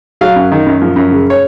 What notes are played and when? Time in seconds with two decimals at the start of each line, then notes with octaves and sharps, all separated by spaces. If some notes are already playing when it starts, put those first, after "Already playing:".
0.21 F#3 F5
0.36 F#2
0.52 D#3
0.66 F#2
0.82 F3
0.96 F#2
1.11 C#3
1.30 C#5